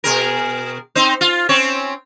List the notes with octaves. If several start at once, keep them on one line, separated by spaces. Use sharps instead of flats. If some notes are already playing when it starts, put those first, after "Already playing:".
B2 G#4 A#4
C4 D#4 C5
F4
C4 C#4 C#5